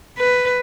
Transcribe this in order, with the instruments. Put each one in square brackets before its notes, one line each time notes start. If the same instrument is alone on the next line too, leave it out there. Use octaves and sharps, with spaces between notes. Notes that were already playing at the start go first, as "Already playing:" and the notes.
[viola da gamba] B4